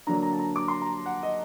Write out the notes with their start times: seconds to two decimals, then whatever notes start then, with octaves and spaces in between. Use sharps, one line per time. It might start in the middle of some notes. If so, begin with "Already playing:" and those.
0.07 D3 F#3 A#3 D4 A#5
0.23 A#5
0.33 A5
0.39 A#5
0.56 D6
0.68 C6
0.81 A#5
1.06 F#5
1.23 D#5